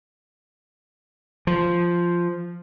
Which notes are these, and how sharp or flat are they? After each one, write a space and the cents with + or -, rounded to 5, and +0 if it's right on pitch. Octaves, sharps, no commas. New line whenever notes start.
F3 -5